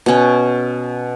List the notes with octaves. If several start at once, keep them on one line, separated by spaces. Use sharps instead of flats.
B2 C#4